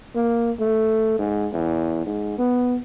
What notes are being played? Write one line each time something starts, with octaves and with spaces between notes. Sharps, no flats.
A#3
A3
G#2
E2
G#2
B3